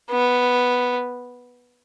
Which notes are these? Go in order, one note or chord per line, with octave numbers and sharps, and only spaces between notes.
B3